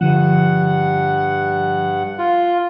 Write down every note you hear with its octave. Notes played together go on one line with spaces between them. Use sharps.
G2 D3 F3 F#5
F4